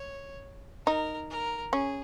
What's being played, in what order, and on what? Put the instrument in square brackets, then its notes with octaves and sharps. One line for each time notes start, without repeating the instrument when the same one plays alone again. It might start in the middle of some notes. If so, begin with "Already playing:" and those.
Already playing: [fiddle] C#5
[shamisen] D#4 [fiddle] A#4
[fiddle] A#4
[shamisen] C#4 [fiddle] G#4